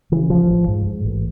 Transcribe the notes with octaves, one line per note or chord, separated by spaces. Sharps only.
C#3 E3
A1 F3
A1
G#2
G#2
A1